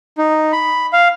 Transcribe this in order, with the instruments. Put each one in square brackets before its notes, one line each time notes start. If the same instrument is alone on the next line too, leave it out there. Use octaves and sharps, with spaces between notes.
[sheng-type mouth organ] D#4
B5
F5